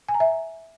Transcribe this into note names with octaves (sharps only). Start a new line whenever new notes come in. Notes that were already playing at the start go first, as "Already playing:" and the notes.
G#5
A#5
E5